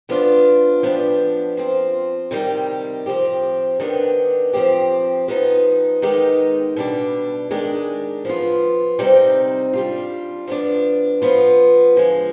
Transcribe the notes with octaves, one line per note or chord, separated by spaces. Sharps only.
F3 B3 D4 F4
F3 B3 D4 G4
F3 C4 F4
C3 D#3 G3
F3 C4 G4
D#3 B3 D4 G4
F3 C4 G4
F3 B3 D#4
D#3 G#3 B3 D#4 G4
B2 G3 D4
D#3 G#3 D4 G4
F3 B3 F4
C3 G3 C4 D#4
G3 D4 F4
F3 B3 D4
F3 B3 F4
D3 F3 G#3